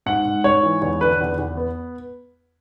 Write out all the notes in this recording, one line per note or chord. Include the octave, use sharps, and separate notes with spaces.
G#2 F#5
G#2
G#2 C#5
E3
E2 C#5
D3 B4
E2
E2
B3